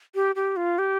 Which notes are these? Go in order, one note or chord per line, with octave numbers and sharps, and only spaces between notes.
G4
G4
F4
G4